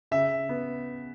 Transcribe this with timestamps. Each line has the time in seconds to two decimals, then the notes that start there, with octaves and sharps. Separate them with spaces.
0.11 C#3 E5
0.49 B3